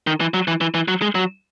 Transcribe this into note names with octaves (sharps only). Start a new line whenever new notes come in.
D#3
E3
F#3
E3
E3
E3
F#3
G#3
F#3